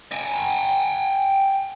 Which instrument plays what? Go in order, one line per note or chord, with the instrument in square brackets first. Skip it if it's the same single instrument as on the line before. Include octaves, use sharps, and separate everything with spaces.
[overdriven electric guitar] G5 G#5